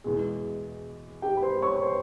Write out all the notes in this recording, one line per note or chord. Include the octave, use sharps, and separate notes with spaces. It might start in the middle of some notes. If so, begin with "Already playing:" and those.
E2 B2 G#3
G4 G5
B5
C5 C6
C#5 C#6
C5 C6